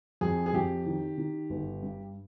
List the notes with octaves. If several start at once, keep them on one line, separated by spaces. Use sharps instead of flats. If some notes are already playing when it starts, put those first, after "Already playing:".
F2 G#4
G#4
F2 G4
D#3
D#3
G1
G2